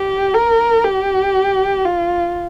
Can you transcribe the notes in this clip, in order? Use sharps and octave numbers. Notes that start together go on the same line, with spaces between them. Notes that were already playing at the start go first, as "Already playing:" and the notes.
Already playing: G4
A#4
G4
F4